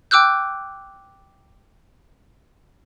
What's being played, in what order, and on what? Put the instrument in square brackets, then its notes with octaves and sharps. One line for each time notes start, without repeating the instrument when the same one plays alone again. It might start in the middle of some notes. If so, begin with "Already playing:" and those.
[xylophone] G5 D6 E6 F#6 G6